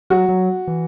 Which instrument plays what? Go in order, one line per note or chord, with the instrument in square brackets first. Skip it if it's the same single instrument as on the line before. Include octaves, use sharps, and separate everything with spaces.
[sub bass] F#3 [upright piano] F#4
[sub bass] F#3
E3